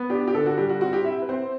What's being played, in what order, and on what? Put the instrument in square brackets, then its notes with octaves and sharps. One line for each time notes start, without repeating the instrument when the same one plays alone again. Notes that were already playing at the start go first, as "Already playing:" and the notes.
Already playing: [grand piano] B3
[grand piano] D4 [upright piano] G4
[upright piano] G4
[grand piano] D3 [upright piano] A4
[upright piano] F#4
[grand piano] G3 [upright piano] G4
[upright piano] F#4
[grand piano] C4 [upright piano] F#4
[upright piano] G4
[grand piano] E4 [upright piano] E5
[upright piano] B4
[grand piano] C4 [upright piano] C5